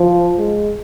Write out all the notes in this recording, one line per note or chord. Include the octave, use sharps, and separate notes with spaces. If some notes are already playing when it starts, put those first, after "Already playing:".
Already playing: F3
G#3